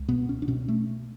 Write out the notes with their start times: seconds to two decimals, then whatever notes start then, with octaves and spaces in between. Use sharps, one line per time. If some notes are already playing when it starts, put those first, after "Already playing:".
Already playing: C#2
0.08 B2 B3
0.29 C#4
0.42 D4
0.48 B2 C#4
0.68 A3